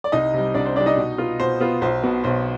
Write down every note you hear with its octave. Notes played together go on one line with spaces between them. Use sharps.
D5
C2 D#4 D#5
C3 G3
C2 D4 D5
C5
C3 G3 D4 D5
D#4 D#5
B2
B3 F4
B2 C5
B3 F4
B1 C5
B2 B3
B1 C5